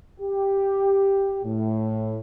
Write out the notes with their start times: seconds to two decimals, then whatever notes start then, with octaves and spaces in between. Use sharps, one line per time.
0.19 G4
1.45 A2